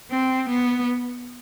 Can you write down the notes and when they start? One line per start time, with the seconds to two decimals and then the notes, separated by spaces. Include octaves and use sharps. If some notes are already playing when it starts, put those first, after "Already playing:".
0.11 C4
0.49 B3